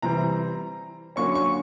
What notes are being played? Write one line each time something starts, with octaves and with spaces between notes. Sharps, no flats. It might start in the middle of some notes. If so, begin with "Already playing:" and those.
C3 E3 G3 C4 A#5
D3 F#3 A#3 C#4 C#6
C#6